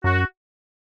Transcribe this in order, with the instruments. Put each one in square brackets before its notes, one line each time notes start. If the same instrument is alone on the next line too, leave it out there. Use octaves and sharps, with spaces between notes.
[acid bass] F#2 [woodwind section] F#4